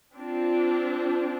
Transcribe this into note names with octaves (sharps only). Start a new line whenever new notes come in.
C4 D4 F4